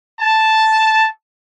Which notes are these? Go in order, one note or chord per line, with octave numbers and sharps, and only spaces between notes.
A5